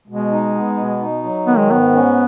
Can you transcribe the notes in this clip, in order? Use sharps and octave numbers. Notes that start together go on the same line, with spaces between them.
B2 G#3
D#4
B3
B2
D#4
F#3
D#3 B3
G#3
G#2 B3
C#4